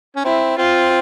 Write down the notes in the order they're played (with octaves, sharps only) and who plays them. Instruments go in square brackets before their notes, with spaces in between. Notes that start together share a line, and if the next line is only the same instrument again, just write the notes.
[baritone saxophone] C#4
[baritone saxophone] C4 [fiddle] E4
[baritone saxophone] C4 [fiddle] F4